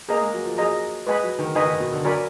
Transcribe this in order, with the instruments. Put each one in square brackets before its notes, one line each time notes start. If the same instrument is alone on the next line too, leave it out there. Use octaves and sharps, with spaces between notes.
[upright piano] A#3 [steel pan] G#4 D#5 A#5
[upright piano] G#3
F#3
F3
[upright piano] F#3 [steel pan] G#4 D#5 A#5
[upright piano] G#3 [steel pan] B4 D#5 G#5 B5
[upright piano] F#3
D#3
[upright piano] D#3 [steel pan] B4 D#5 G#5 B5
[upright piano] D#3
B2
D3
[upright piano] F#3 [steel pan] A#4 D5 G#5 B5